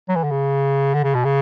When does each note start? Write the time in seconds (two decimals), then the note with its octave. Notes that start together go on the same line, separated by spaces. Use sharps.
0.09 F#3
0.16 E3
0.24 D3
0.31 C#3
0.94 D3
1.04 C#3
1.14 B2
1.25 C#3